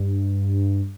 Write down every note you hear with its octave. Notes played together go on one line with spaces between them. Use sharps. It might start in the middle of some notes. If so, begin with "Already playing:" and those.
Already playing: G2